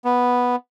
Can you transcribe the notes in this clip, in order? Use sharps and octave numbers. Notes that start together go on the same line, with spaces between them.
B3